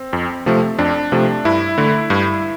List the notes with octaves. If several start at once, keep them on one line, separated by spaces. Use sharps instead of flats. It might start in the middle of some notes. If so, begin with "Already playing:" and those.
Already playing: C4
F2
C3 F3 A3
F2 D4
C3 F3 A3
G2 E4
D3 A3
G2